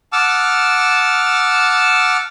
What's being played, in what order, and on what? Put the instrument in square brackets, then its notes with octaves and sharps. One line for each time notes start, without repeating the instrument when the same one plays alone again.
[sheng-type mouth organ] F#5 A5 D6 E6 F6